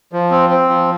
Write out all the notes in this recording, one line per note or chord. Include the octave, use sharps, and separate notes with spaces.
F3
C4
C4
F3